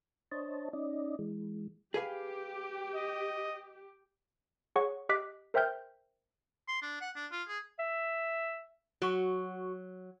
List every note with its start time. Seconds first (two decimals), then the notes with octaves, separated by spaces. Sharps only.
0.32 D4 C5 C#5 D#5 A5
0.73 C#4 D#4 D5 D#5
1.19 E3 G#3
1.94 G4 G#4 B4 F5
2.95 D#5
4.76 G#4 C#5 F#5 C#6
5.09 G4 D#5 D6 F#6 B6
5.54 A#4 C5 E5 G5 F6 G6
6.68 C6
6.82 D4
7.01 F#5
7.16 D4
7.32 F4
7.48 G#4
7.79 E5
9.02 F#3 F#4 C#6